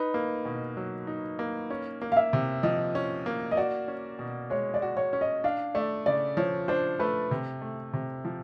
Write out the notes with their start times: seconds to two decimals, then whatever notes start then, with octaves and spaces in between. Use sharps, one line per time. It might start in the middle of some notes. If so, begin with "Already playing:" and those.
Already playing: D#4 B4
0.14 A#3
0.45 B2
0.77 F#3
1.07 D#4
1.39 A#3
1.70 C#4
2.02 A#3
2.12 F5
2.17 E5
2.33 C3
2.63 F3 D#5
2.95 C#4
3.26 A#3
3.51 D#5
3.57 F#4 D5
3.88 C#4
4.19 B2
4.50 G#3 C#5
4.74 D5
4.82 F#4
4.97 C#5
5.13 C#4
5.21 D#5
5.44 D4 F5
5.75 A3 D5
6.06 C#3 D5
6.37 F3 C#5
6.68 D4 C5
6.99 A3 B4
7.31 C3
7.62 A3
7.94 C3
8.25 F3